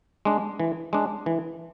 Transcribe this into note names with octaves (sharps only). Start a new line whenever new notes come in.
G#3 D4
E3
G#3 D4
E3